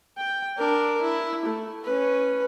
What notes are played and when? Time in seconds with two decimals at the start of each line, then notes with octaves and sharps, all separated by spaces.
0.18 G5
0.58 D4 A#4
1.02 E4
1.45 A3
1.84 C#4 B4